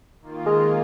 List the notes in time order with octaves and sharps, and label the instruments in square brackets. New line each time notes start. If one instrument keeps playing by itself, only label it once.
[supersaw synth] D#3 A#3 F4
[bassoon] G#3